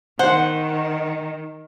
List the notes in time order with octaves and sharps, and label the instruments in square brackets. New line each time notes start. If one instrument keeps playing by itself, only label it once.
[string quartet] D#3 [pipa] C5 [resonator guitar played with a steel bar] F#5